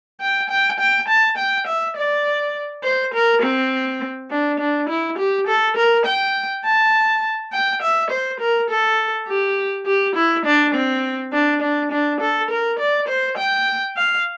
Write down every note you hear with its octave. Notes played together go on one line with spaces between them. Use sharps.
G5
G5
G5
A5
G5
E5
D5
C5
A#4
C4
D4
D4
E4
G4
A4
A#4
G5
A5
G5
E5
C5
A#4
A4
G4
G4
E4
D4
C4
D4
D4
D4
A4
A#4
D5
C5
G5
F5